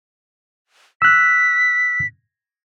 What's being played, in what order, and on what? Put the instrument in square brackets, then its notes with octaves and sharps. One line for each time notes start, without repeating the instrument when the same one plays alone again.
[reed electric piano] E6 F#6 [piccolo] B6